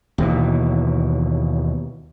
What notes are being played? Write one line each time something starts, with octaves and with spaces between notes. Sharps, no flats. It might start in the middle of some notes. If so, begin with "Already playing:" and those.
D#2 B2 E3